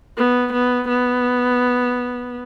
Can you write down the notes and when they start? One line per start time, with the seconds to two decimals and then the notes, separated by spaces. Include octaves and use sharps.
0.17 B3
0.53 B3
0.88 B3